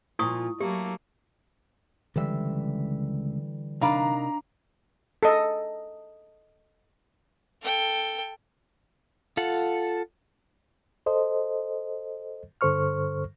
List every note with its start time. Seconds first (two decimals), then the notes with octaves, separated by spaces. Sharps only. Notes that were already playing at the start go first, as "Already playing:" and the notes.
0.19 A#2 F3 E4 C#6 D#6
0.60 F#3 A3 A#3 E4 G4
2.16 C#2 D3 E3 G3 E5
3.81 C3 D4 D#4 A#4 F5 A#5 B5
5.23 A4 D#5
7.61 A4 G5
9.37 F4 A4 F#5
11.06 A4 C5 D#5
12.61 G2 D3 A4 C5 C#6 F6